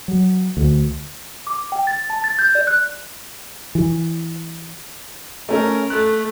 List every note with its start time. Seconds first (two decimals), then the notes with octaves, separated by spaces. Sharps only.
0.08 F#3
0.57 D2
1.47 D6
1.72 G5
1.87 A6
2.10 A5
2.24 A6
2.39 G6
2.55 D5
2.67 F#6
3.75 E3
5.49 A3 C#4 A#4
5.90 A3 F#6